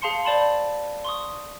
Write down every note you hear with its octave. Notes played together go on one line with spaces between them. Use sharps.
G#4 F5 A5 C6 C#7
C5 D5 A5 B5 C6
C6 C#6 D#6